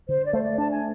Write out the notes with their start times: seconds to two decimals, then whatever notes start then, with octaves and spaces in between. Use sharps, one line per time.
0.08 D3 C5
0.25 D5
0.33 A3 C5
0.42 D5
0.58 D4 A5
0.71 G#5